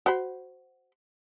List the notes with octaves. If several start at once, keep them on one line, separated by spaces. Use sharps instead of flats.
F#4 C5 B5